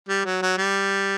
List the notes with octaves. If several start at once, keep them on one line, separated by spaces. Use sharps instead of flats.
G3
F#3
F#3
G3